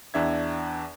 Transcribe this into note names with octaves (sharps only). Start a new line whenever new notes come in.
E2 D4 E5 G#6